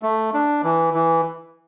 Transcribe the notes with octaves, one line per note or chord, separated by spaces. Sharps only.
A3
D4
E3
E3